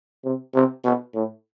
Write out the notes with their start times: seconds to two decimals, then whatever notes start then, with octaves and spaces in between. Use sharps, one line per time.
0.24 C3
0.54 C3
0.84 B2
1.14 A2